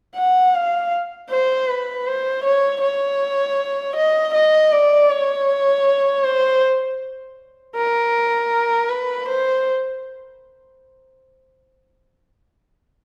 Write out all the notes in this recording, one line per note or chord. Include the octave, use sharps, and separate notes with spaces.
F#5
F5
C5
B4
C5
C#5
C#5
D#5
D#5
D5
C#5
C5
A#4
B4
C5